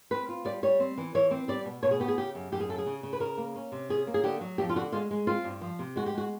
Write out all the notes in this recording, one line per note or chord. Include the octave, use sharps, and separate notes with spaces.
C4 B4
F4
G3 D5
G3 C#5
C4
E3
E3 C#5
C4
G3 D5
B2
B2 C#5
G#4
B3 G4
G#4
C#3 G4
F#2
F#2 G4
G#4
C#3 A4
G#4
C#3
C#3
B4
C#3 A#4
A#3
C#4
C3
C#4 G#4
A#3
G#4
D3 G4
F#3
F2 G4
F4
D3 F#4
G#3 F4
G#3
C4 F4
G2
F3
C3
G#3 F#4
G4
G#3 F#4